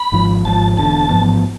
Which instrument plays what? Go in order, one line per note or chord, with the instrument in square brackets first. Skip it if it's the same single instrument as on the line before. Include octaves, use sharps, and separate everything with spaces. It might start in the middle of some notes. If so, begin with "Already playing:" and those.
Already playing: [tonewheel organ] B5
[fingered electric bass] G#1 G#2 F3
[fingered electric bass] G#1 G#2 F3 [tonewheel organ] A5
[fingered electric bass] E1 E2 D3 [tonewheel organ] A5
[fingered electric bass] A1 G#2 F3 B3